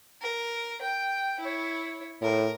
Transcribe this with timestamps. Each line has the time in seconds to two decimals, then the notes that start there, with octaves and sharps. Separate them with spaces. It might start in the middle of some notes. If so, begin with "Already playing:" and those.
0.21 A#4
0.81 G5
1.40 E4 C#5
2.22 A2 A#4